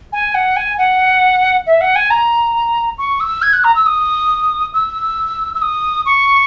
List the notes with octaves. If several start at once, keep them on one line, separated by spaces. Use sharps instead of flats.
G#5
F#5
G#5
F#5
E5
F#5
G#5
A#5
C#6
E6
G#6
F#6
A#5
E6
D#6
E6
E6
D#6
C#6